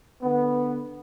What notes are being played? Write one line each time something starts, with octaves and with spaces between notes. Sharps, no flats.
D3 B3